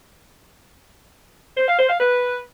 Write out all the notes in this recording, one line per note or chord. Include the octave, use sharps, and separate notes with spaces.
C5
F5
C5
F5
B4